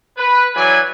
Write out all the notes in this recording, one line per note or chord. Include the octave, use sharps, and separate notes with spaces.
B4
E3 F#3 G#4 B4 D5 G#5